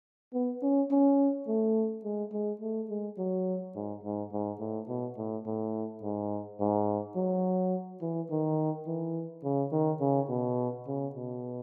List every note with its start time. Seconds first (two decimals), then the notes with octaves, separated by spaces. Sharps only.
0.34 B3
0.63 C#4
0.91 C#4
1.48 A3
2.04 G#3
2.33 G#3
2.61 A3
2.90 G#3
3.18 F#3
3.76 G#2
4.04 G#2
4.32 G#2
4.60 A2
4.88 B2
5.18 A2
5.46 A2
6.03 G#2
6.60 G#2
7.16 F#3
8.01 E3
8.31 D#3
8.87 E3
9.44 C#3
9.72 D#3
10.01 C#3
10.29 B2
10.87 C#3
11.16 B2